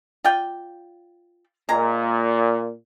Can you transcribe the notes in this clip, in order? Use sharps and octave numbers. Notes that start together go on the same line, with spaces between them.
F4 D5 G5
A#2 G#3 A#5